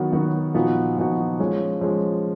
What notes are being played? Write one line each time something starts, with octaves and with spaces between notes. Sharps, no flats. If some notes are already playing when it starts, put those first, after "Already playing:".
Already playing: D#3 F#3 B3 F#4
D#3 F#3 B3 F#4
A#2 F3 B3 D#4 F#4
A#2 F3 B3 D#4 F#4
F3 G#3 C#4
F3 G#3 C#4